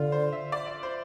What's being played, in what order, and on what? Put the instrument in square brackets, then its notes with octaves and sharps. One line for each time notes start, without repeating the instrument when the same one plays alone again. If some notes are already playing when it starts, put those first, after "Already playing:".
Already playing: [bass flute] D3 [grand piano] F4
[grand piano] C5
E5
D5
D5
C5